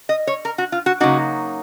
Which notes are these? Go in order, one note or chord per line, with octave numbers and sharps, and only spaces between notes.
D#5
C#5
A#4
F#4
F4
F#4
C#3 F#3 A#3 D#4 F#4